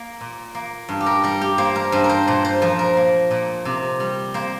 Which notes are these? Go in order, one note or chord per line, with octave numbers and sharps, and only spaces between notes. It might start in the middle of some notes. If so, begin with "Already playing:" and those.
Already playing: A#3
A#2
A#3
G2
G4
A#4
G3 A#4
G4
A#3 C5
A#4
G2 C5
A#4
C5
A#2 C5
C5
F3 A#4
A#4
A#3
A#2
C3
G3
A#3 C5